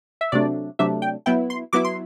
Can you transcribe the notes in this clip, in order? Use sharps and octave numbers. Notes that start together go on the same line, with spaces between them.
E5
C3 F#3 A3 D4 D5
C3 F#3 A3 D4 E5
G5
F#3 B3 E4 G5
C6
F#3 B3 E4 D6
C6